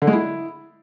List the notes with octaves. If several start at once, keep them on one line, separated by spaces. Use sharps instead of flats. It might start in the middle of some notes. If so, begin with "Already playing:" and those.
D3
G#3
E4